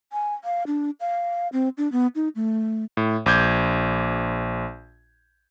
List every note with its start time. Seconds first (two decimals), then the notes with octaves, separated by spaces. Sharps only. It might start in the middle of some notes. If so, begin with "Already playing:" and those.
0.13 G#5
0.44 F5
0.67 D4
1.00 F5
1.53 C4
1.78 D4
1.92 B3
2.16 D#4
2.36 A3
2.97 A2
3.26 A#1 D6 G6 G#6